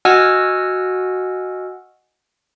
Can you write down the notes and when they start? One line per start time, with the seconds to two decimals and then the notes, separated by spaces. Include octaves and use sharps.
0.05 F#4 D#5 F#5 G#5 E6 F6